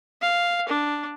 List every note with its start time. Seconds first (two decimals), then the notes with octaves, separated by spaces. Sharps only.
0.22 F5
0.69 D4